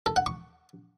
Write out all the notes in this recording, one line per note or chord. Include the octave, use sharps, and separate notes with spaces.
A4
F#5
C#6